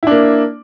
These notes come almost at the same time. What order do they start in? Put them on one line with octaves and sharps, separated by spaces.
E4 D4 A#3